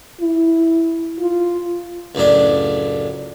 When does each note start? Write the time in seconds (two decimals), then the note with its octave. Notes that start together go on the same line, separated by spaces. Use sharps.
0.21 E4
1.19 F4
2.15 C#2 F#2 A2 D4